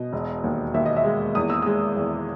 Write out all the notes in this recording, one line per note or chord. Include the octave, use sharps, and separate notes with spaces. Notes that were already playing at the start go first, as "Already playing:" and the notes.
Already playing: B2 D#5
E1
D#2
D#2 E5
D#5
E5
G#3
E2 D#6
E6
G#3 D#6
E2